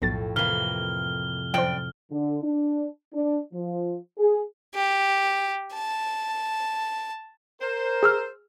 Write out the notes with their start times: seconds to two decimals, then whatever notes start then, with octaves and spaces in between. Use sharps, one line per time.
0.02 B1 F2 A2 A6
0.36 C3 E3 A#3 F6 G7
1.54 F#2 F3 C5 D5 G5
2.12 D3
2.44 D4
3.14 D4
3.53 F3
4.18 G#4
4.75 G4
5.74 A5
7.61 A#4 C5
8.03 G#4 E6 F6